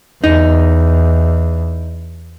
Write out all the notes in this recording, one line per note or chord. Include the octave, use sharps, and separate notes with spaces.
E2 D#4